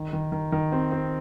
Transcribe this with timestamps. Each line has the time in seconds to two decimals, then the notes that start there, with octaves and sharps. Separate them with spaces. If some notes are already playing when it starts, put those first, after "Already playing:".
Already playing: D#3
0.13 D#3
0.32 D#3
0.52 D#3
0.72 C4
0.92 C4